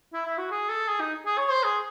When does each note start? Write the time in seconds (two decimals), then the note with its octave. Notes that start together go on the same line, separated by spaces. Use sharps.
0.13 E4
0.26 E4
0.38 F#4
0.51 G#4
0.69 A4
0.88 G#4
1.00 D#4
1.26 G#4
1.37 C#5
1.50 C5
1.63 G#4